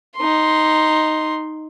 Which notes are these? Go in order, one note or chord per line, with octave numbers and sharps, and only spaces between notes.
D#4 C6